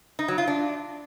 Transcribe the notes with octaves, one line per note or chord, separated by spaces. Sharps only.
D#4
F#3
F4
D4